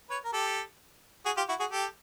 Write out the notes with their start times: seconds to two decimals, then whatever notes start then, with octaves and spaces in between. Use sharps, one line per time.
0.10 B4 C#5
0.25 A#4
0.33 G4 A4
1.25 F#4 G#4
1.37 F4 G4
1.49 E4 F#4
1.60 F#4 G#4
1.71 G4 A4